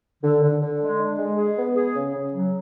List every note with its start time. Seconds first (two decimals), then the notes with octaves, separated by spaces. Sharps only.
0.22 D3
0.42 D3
0.60 D3
0.80 G#3
0.98 D4
1.18 G#3
1.37 G#4
1.57 B3
1.75 G#4
1.94 C#3
2.14 C#3
2.33 F#3